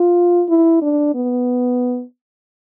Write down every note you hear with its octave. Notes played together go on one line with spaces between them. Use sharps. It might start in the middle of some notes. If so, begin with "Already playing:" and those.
Already playing: F4
E4
D4
B3